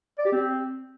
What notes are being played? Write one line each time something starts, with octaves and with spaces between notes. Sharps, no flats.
D5
G4
C4